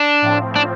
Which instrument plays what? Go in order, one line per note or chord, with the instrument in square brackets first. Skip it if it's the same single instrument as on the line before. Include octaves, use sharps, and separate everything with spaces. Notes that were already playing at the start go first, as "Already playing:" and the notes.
Already playing: [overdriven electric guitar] D4
[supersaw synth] A2 F3 C4
[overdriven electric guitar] D4